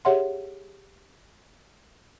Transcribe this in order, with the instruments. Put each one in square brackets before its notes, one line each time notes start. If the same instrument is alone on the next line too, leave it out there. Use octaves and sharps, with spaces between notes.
[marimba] G4 G#4 C#5 E5 F#5 C6